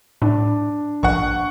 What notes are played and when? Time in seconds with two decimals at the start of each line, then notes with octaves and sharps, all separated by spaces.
0.22 A2 D4
1.03 A#1 G2 F#5 C#6